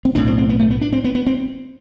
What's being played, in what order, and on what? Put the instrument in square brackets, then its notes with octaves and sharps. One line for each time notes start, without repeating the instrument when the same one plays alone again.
[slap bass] C4
B1 A2 D4
C4
C4
B3
A3
B3
D4
C4
B3
B3
C4